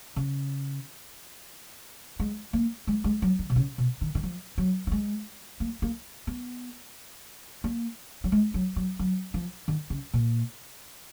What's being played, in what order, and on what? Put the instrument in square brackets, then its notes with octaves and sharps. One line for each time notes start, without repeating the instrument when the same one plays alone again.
[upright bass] C#3
G#3
A#3
G#3
G#3
F#3
D#3
B2
C#3
B2
D#3
D#3
F3
F#3
F#3
G#3
A#3
A#3
B3
A#3
F#3
G#3
F#3
F#3
F#3
F3
D#3
C#3
A#2